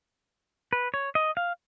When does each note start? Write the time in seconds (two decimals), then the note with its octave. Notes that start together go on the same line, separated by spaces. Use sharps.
0.73 B4
0.94 C#5
1.15 D#5
1.37 F5